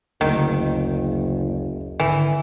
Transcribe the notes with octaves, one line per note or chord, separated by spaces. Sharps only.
F#1 D2 D#3
G#1 D3 E3